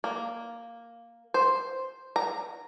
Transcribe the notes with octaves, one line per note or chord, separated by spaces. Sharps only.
A#3
C5
A#5